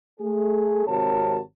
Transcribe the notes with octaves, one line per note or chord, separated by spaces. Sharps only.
A3 G#4
G#1 C3 F#4 A#4 C#5 A5